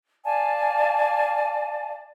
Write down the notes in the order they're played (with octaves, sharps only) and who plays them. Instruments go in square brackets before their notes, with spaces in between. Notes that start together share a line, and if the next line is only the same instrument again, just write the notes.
[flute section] D5 F5 G#5 A5